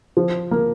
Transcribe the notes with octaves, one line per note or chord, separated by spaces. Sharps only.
F3
A#3